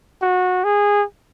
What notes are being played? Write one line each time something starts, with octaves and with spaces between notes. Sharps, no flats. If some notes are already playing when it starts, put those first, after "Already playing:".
F#4
G#4